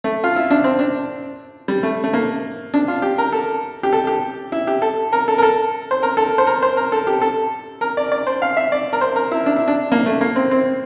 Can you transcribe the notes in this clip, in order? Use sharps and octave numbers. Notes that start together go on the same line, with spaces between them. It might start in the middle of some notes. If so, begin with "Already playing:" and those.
A3
F4
E4
D4
C4
D4
G3
A3
A3
A#3
D4
F4
G4
A#4
A4
G4
A4
G4
E4
G4
A4
A#4
A4
A#4
A4
C5
A#4
A4
C5
A#4
C5
A#4
A4
G4
A4
A#4
D5
D5
C5
F5
E5
D5
A#4
C5
A#4
E4
D4
E4
D4
A#3
A3
A#3
C4
C4